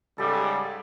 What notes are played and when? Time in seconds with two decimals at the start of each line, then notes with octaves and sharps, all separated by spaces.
0.18 G#2 C#3 G3 G4 A4